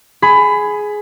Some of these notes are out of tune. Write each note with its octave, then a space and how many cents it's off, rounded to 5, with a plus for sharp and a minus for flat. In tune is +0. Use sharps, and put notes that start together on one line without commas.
G#4 +10 B5 +20